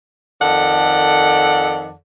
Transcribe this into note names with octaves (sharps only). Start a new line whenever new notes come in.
F2 D#3 A4 D5 F#5